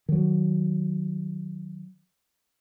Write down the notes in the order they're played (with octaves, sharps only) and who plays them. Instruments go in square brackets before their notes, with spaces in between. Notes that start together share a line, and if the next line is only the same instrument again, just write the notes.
[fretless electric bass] D#3 F#3